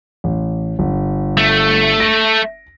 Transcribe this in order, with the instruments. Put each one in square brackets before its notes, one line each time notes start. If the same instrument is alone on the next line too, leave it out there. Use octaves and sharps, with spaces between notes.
[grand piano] A1
G1
[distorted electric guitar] A3
[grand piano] A#6 D7